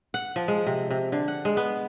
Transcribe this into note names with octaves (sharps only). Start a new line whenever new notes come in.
F#5
F3
G#3
C3
C3
D3
F#5
G#3
B3